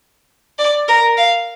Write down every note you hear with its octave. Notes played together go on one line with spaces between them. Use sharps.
D5
A#4
F5